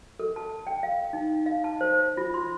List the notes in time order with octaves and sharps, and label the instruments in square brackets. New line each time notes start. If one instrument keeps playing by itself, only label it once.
[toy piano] A4
A5
G5
F5
D#4
F5
A5
C5
F4
C6